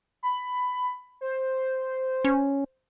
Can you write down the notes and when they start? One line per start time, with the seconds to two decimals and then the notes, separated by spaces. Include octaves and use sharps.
0.23 B5
1.21 C5
2.24 C#4